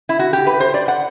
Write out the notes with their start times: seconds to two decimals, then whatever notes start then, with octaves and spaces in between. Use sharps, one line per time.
0.09 E4
0.19 F#4
0.33 G4
0.47 B4
0.60 C5
0.74 D5
0.88 F#5